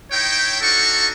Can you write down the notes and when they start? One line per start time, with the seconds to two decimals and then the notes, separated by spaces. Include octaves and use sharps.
0.12 D#4 E4 C#5 G5
0.61 D4 D#4 F#4 A4 C#6